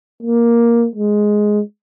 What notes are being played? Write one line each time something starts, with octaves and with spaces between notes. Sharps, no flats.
A#3
G#3